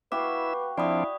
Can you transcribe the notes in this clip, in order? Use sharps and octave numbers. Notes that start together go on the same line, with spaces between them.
E4 F#4 G4 B4 E5 F5 D6
F3 C4 D4 E4 D5 B5 D#6